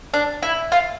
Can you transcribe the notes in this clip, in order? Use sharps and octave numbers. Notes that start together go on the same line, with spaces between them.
D4
E4
F4